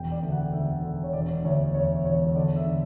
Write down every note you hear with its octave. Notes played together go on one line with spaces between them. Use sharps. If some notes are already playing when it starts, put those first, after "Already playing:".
Already playing: E1 G5
D5
D2
F#5
D2 E5
D3
C#5
E1 D5
D2 C#5
E1 C#5
E1 C#5
C#5
D3 D5
E5
D3